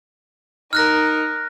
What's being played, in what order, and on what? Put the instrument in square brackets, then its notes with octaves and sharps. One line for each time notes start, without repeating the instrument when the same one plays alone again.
[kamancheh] D#4 A#4 [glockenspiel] F6 F#6 A#6